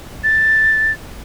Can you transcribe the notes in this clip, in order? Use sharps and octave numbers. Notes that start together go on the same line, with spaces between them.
A6